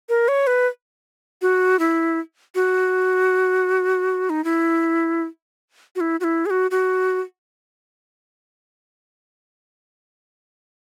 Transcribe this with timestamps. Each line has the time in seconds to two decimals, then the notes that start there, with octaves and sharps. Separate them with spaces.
0.09 A#4
0.28 C#5
0.47 B4
1.42 F#4
1.79 E4
2.55 F#4
4.30 D#4
4.44 E4
5.96 F#4
6.01 E4
6.20 F#4
6.24 E4
6.46 G#4
6.50 F#4
6.71 F#4